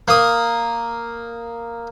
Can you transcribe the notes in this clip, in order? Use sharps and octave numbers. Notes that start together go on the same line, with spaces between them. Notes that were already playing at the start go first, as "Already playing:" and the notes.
A#3 D#6